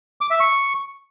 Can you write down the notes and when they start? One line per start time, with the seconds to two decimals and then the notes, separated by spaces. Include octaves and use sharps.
0.21 D6
0.31 E5
0.40 C#6